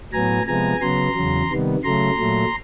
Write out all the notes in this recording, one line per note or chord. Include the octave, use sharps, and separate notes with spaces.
A2 F#3 B3 G#5 A#5
C3 F3 G#3 B3 G#5 A#5
C#3 F#3 B3 A#5 C6
E2 C#3 F#3
C3 D#3 G3 B3
C#3 F#3 A3 A#5 C6
A#2 F#3 A3